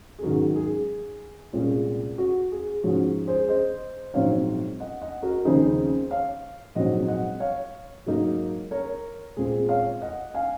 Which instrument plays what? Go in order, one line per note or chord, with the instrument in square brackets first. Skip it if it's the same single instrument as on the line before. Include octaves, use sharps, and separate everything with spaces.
[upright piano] G#4
G#2 D#3 F#3 C#4 F#4 A#4
G#4
C2 A#2 G#3 C#4 F4
F#4
G#4
G#2 F3 G#3 C#4 F#4
G#4 C5
C5 D#5
A#1 G#2 F#3 C4 D#4 C#5 F5
D#5 F#5
D#5 F#5
F#4 A#4
D#2 C#3 F3 C4 D#4 G#4 C5
C#5 F5
A#1 G#2 F#3 C4 D#5 F#5
D#5 F#5
C#5 F5
G#2 F#3 A#3 D#4
A#4 C#5
A#2 G#3 C4 F4 G#4
C#5 F5
D#5 F#5
F5 G#5